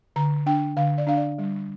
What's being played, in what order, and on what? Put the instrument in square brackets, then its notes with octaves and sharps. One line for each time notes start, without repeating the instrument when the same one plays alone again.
[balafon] D3 A#5
D4 G5
D3 F5
D5
D4 F5
D5
G3